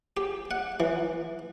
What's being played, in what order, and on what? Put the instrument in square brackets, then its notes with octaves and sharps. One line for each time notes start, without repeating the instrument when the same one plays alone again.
[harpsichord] G4
F#5
E3